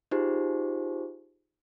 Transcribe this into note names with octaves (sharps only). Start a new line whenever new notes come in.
D#4 F4 G4 G#4 C5